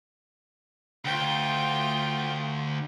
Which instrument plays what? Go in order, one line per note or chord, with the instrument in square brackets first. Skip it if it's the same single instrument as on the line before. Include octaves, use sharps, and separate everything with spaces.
[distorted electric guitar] D2 [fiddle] F4 G5